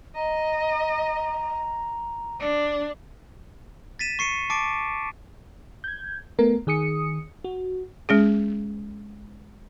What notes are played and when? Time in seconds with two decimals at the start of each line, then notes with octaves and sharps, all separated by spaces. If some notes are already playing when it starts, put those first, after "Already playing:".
0.16 D#5 A#5
2.40 D4
3.99 A6 B6 D#7 E7
4.19 C#6 C7 C#7 D#7
4.50 A5 C#6 D6 A6 C7 D7
5.84 G6 G#6
6.39 A3 B3 A#4
6.67 D#3 G#4 D#6 C#7
7.44 F#4
8.09 G#3 C#4 G#4